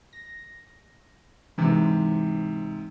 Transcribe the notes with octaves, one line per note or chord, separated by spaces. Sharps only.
A#6
G#2 C3 E3 G#3